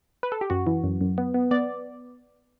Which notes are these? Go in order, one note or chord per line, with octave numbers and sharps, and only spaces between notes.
B4
A4
G4
F#2 F#4
E3
F#2
F#2
B3
B3
B3 D5